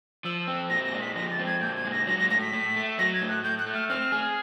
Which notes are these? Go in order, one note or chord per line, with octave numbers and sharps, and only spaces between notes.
F3 E6
C4
A#2 A#6
A#6
G#3
B6
F3 A#6
A6
C4
G#6
A#2 G6
G#6
G#3
A#6
F#3 A#6
A#6
A2 A#6
B6
A2
A3
F#3 A#6
G#6
A2
F#6
A2 G6
F#6
A3
F6
C4 F6
G#4